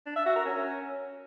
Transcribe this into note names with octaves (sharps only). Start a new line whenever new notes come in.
D4
E5
F#4
A#4
C#4